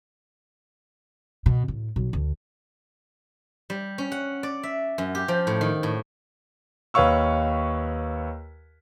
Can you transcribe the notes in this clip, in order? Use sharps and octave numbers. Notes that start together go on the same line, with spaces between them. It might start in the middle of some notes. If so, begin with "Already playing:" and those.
B2
A2
B1
D2
G3
C#4
F#5
D5
E5
F#2
G4
F3
A2
D#3
A2
D#2 B4 C#5 F5 C#6 E6